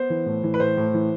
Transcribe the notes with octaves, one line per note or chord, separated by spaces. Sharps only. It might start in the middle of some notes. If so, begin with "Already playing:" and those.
Already playing: B3 C5
E3
A2
E3
B4
A2 C5
A2
E3